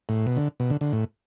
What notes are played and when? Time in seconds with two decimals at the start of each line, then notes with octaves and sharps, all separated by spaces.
0.09 A2
0.27 B2
0.37 D3
0.60 B2
0.70 D3
0.81 D3
0.93 A2